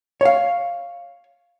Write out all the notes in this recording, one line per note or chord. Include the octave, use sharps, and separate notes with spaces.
C#5 F5